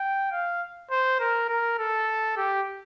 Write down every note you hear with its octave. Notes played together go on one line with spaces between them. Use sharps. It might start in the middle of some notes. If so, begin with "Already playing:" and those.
Already playing: G5
F5
C5
A#4
A#4
A4
G4